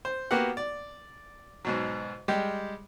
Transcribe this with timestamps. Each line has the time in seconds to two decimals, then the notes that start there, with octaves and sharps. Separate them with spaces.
0.05 C5
0.31 A#3 B3 F#4 G4 F#5
0.57 D5
1.65 G#2 B2 F#3
2.28 G3 G#3 G4